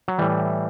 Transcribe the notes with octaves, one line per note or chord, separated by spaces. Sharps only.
F#3
A2 E3 G3